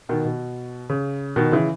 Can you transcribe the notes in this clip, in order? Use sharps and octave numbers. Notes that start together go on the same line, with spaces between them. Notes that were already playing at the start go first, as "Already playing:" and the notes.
B2 D#3
B2
C#3
B2 D#3
C#3 E3